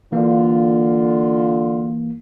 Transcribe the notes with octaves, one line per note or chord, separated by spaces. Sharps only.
D3 E3 A#3 F4